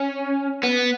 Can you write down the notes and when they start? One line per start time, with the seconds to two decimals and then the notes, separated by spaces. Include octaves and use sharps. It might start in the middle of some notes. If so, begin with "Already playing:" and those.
Already playing: C#4
0.63 B3